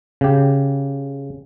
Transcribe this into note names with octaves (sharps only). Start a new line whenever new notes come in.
C#3 G4